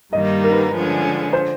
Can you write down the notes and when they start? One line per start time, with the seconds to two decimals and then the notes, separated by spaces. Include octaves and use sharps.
0.12 G2 D#3 G3 A#3 D#4 D#5
0.44 A#4
0.53 B4
0.73 D3 F3 G#3 C#4
1.33 C5